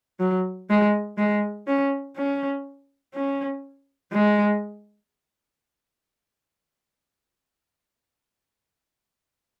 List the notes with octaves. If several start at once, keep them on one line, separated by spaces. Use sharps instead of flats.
F#3
G#3
G#3
C#4
C#4
C#4
G#3